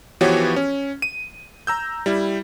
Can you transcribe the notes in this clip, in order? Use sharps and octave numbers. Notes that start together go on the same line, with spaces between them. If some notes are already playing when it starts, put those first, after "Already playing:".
E3 F3 B3 F#4 G4 C#5
C#4
D#7
A#5 E6 G6
G3 E4